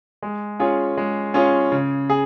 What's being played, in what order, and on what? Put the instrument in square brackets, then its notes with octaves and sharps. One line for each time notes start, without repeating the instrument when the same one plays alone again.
[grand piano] G#3
C#4 F4 G#4 C#5
G#3
C#4 F4 G#4 C#5
C#3
G#4